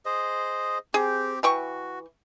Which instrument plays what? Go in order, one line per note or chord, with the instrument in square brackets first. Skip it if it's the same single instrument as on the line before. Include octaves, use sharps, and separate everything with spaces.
[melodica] G#4 C5 D#5
[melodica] C4 G4 [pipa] G#4
[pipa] E3 G5 C#6 [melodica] F#4